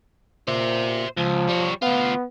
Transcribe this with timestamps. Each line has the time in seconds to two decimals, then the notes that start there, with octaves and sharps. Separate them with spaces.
0.48 A#2 C5 E5
1.17 C#2 F3
1.49 G3 C#5
1.82 D2 B3 F4